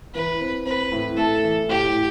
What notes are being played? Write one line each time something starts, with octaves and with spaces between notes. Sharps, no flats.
E3 B4
C4
C4 B4
A2
A3 A4
E3
A2 G4
A2